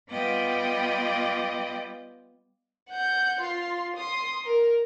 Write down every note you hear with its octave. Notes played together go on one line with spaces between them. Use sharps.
G3 B3 F4 D5 D#5 G5
F#5 G6
F4 C6
C6 D#6
A#4